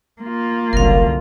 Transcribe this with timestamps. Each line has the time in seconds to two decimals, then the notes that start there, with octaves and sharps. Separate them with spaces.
0.22 A#3 F4
0.73 F#1 C2 F#2 D3 A#4 F5